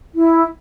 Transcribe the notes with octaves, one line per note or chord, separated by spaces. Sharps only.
E4